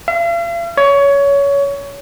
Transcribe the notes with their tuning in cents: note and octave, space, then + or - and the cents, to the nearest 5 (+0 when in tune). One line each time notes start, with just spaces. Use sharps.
F5 -45
C#5 +20